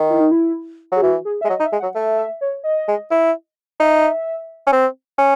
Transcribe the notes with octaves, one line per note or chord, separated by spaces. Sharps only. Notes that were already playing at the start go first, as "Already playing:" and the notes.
Already playing: D#3
E4
D#4
E4
F#3 G#4
E3 F#4
G#4
E5
G#3
F#3 D#5
D#4
E5
G#3
F#5
F#3
A3 E5
E5
C#5
D#5
G#3
E4
D#4 E5
C#4
C4
C#4